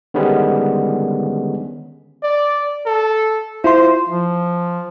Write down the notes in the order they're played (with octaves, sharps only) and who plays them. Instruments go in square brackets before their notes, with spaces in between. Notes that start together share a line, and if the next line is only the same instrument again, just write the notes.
[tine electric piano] D3 D#3 G3 G#3 B3 C#4
[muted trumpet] D5
A4
[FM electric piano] E4 F4 C6 [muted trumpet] C5
[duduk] F3